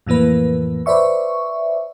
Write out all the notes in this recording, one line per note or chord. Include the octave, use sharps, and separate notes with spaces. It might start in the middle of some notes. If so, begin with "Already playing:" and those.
F2 A2 E3 A#3 B4
B4 C5 D5 E5 C#6